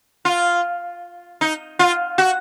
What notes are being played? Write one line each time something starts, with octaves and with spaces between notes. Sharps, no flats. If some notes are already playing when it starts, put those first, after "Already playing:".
F4
D#4
F4
F#4